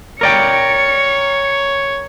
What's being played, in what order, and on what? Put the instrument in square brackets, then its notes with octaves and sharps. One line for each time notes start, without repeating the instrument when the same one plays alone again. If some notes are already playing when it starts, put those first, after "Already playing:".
[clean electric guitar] A#4 D5 G5 [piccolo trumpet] C#5 [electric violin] C#7